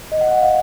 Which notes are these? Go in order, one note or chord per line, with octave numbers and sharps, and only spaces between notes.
D#5
F#5
F#5
F5